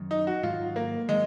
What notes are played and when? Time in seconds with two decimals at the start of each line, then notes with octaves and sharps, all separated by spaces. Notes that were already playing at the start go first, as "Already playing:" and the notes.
Already playing: F#2 D#3 F#3
0.11 D#4
0.27 F#4
0.43 G#2 D#3 F#3 F4
0.76 A#3
1.09 D#3 F#3 G#3